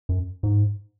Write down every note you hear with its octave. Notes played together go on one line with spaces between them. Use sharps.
F#2
G#2